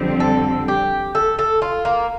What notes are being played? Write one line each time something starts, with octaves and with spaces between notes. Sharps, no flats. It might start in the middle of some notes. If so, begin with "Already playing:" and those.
Already playing: F2 D3 G3 C4
A4
G4
A4
A4
F4
A#3